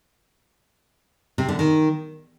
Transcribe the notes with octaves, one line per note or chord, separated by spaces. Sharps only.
C3
D3
D#3